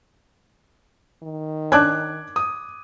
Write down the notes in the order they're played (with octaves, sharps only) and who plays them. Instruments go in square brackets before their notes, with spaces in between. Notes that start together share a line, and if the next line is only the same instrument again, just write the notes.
[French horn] D#3
[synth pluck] C#4 D4 [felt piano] D6 F#6 G#6
[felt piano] D#6